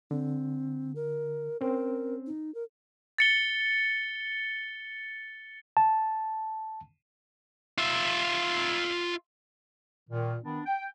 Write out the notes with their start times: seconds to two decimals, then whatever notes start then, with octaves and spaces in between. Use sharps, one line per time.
0.11 D3 C4
0.96 A#4
1.61 C4 C#4 A#4
2.26 D#4
2.55 A#4
3.18 A6 C#7 G7
5.77 A5
7.78 F4 E5
10.09 A#2 D#3
10.42 D#3 B3 D4
10.65 G5